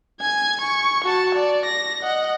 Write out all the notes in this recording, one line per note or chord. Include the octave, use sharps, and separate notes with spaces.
G#5 G#6
C#6
F#4 A5
D5
A#6
D#5 F#5